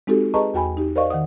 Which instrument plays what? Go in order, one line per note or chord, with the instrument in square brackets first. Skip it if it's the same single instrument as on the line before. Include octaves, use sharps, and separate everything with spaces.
[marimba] G#3 C4 D#4 F#4 G4 A4
G#4 B4 D#5 A5 A#5 C#6
E2 F#4 G5 G#5 B5
D#4 G4
A#4 C5 D5 D#5 F5 C#6
D#3 F#5 D#6